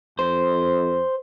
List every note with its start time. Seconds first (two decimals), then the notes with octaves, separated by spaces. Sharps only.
0.19 F2 C5